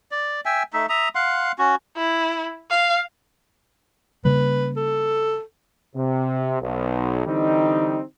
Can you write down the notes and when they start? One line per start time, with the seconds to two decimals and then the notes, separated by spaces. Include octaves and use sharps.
0.11 D5
0.45 E5 G5 G#5
0.73 A3 D#4 E5
0.89 E5 A#5 D#6
1.15 F5 F#5 C6
1.59 C#4 F#4
1.97 E4
2.71 F5
4.25 C#3 G3 A#3 B4
4.76 A4
5.95 C3
6.61 B1
7.26 D3 E3 G3 C4 D#4